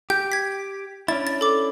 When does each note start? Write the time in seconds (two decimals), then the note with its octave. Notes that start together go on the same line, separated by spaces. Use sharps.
0.10 G4 G6
0.32 G#6 B6
1.08 C#4 D4 E4 A6
1.27 A6
1.41 A4 D6